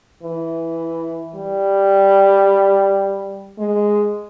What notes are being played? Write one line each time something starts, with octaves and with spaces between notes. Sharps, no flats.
E3
G3
G#3